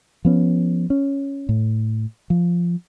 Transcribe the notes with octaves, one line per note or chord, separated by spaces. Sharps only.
F3 B3 C#4
C#4
A2
F3